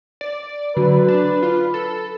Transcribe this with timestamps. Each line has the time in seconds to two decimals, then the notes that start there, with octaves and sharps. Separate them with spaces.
0.21 D5
0.76 D3 F#3 B4
1.08 D4
1.43 F4
1.74 A4